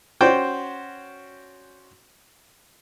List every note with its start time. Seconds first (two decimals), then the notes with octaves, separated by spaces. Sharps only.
0.21 C#4 F#4 C5 D5 G5